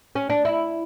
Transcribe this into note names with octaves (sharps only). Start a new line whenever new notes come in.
C#4
D4
E4